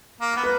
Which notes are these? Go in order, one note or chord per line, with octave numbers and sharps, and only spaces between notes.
A#3
B3
B4